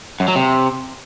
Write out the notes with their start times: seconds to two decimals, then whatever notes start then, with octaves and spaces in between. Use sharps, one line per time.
0.20 F#2
0.28 F#3
0.36 C3